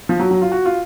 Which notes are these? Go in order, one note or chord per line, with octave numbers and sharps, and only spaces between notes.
F3
F#3
F#3
F4
F#4
F4